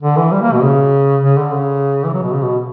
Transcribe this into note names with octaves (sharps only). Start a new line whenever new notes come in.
D3
E3
G3
A#3
B2
C#3
C#3
D3
C#3
E3
F#3
B2
C#3
B2